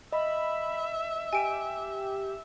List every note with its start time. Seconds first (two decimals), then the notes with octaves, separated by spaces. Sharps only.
0.12 D#5 E5 B5
1.33 G4 G#5 D7